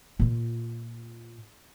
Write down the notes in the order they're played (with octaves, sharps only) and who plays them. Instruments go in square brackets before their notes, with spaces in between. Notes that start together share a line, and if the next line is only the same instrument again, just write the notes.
[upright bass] A#2 F4